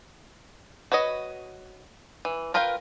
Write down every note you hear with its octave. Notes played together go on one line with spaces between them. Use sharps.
F#4 B4 C#5 D#5
E3
F4 A#4 B4 F5 G5